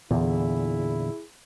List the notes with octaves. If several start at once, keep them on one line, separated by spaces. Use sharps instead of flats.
E2 A#2 D3 E4 G#4